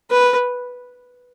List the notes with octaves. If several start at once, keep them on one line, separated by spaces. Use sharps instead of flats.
B4